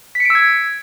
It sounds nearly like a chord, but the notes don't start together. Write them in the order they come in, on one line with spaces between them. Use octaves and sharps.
B6 C#7 D7 E6 G#6